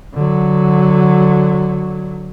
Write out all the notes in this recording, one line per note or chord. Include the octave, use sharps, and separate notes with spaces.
D3 F#3